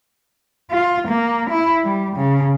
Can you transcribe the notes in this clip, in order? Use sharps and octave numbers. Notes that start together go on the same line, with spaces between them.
F4
A#3
E4
G3
C#3